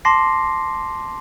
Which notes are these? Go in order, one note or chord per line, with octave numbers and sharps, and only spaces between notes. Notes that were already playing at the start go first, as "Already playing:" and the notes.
A5 C6 D6 A#6 C7